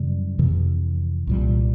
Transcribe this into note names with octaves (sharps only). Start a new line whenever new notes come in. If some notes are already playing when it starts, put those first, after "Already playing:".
Already playing: F#2 C#3 E3 G3
F2 C3 E3
C2 A#2 G3